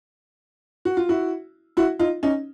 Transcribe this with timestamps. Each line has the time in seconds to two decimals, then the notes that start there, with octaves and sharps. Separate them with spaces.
0.85 F#4
0.97 F4
1.09 E4 F#4
1.77 E4 F#4
1.99 D#4 F4
2.23 C#4 D#4